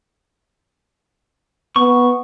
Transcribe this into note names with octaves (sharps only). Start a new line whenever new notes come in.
B3 C#6